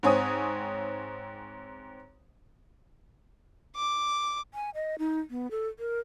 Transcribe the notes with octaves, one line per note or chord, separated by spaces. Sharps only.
G#2 C4 C#5 G#5 D#6
D6
G#5
D#5
D#4
B3
A4
A#4